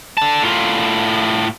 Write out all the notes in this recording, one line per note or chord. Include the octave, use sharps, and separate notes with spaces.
D3 A5
A2 F4